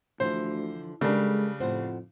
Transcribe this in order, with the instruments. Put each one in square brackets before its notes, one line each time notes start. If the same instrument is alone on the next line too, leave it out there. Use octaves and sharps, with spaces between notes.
[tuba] D2 [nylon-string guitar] D3 E3 F3 [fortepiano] C5
[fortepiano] C#3 G3 D4 [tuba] G#3 [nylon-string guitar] A4 A#4
[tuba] F2 [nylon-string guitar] A2 C5 F#5